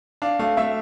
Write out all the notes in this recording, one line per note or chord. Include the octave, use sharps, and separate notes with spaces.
D4 F5
A3 F5
A3 E5